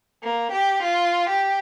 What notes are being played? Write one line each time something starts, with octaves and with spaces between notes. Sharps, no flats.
A#3
G4
F4
G4